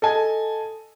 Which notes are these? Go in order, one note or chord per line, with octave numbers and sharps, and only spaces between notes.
A4 D#5 G#5